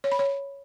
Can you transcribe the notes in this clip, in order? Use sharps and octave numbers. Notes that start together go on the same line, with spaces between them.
C#5
B5
C#5